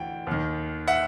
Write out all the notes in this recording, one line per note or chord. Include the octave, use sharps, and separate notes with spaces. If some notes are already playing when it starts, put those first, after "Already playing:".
Already playing: D2 E3 G5
D#2 D#3
E5 F#5